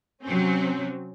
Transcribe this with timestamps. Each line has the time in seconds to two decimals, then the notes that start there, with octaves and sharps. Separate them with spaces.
0.23 C3 F#3 C4 C#4